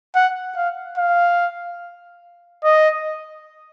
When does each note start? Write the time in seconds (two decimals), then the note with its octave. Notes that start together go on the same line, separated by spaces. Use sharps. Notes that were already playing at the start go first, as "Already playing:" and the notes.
0.15 F#5
0.56 F5
0.98 F5
2.64 D#5